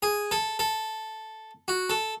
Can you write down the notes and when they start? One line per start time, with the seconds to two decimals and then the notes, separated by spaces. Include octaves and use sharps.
0.03 G#4
0.31 A4
0.59 A4
1.68 F#4
1.90 A4